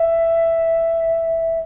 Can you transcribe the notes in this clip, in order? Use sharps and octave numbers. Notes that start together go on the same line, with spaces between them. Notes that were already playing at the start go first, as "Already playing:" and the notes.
Already playing: E5